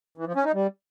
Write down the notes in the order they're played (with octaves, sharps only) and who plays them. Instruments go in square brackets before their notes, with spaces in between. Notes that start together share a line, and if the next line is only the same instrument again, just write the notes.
[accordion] E3
F3
C#4
D#4
G3